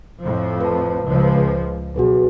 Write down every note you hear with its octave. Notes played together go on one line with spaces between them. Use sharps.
F2 A2 F3
B4 A5
C#2 F3
B1 F#4 G#4 B4